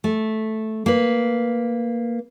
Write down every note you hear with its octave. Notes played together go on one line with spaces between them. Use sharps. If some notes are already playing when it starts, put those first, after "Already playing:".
A3
A#3 B4